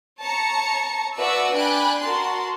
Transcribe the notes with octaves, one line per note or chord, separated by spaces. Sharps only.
C#5 A5 A#5 C#7
F#4 B4 D5 E5 A5 E6
D4 D5 G5 G#5 B5 F#6
F#4 A#4 A5 C6